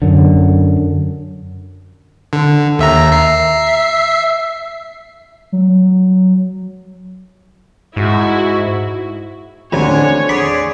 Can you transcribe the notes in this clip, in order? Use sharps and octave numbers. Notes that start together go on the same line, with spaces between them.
F#2 D3
D3
D#2 E5 A#5
E5 C7
F#3
G#2 E4 F#4
A1 D2 A2 D3 C4 D4 C#5 G#5
G#4 D5 B5